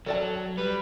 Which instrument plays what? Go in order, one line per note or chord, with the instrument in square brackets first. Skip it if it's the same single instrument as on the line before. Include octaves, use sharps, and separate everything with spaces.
[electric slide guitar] F#3 [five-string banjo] A4 D5 A5
[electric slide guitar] G3 [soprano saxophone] B4